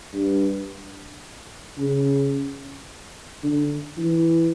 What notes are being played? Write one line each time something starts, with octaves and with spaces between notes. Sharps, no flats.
G2
C#3
D3
E3